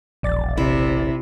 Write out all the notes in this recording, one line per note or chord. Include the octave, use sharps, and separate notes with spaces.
E1 A#1 D5 A6
C3 E4